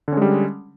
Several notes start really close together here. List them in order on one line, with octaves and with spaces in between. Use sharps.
D3 C#4 G#3 G3